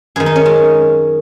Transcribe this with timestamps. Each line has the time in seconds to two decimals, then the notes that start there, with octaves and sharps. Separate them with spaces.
0.16 F#2 D#3 G#4
0.26 D#4
0.36 C#4
0.46 G#3